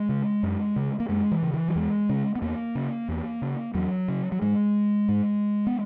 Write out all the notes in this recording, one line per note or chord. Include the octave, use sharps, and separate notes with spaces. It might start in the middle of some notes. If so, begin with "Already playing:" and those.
Already playing: G#3
C#3
F#2
C#3
A#3
F#2 G#3
E3
C#3
E3
F#3
E2 G#3
C#3
B3
E2 A#3
C#3
E2
C#3
E2 F#3
C#3
F#3
G#2 G#3
G#2
B3